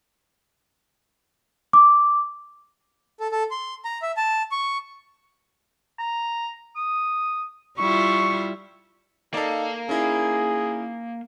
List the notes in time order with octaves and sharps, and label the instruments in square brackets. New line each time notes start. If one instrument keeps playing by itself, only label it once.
[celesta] D6
[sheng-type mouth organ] A4
A4
C6
A#5
E5
A5
C#6
[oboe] A#5
D#6
[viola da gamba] G3 E4 F4 [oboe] C#6
[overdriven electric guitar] A#3 F5 [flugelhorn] D#4 [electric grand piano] A4 D5
[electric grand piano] C#4 D#4 E4 [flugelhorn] G#4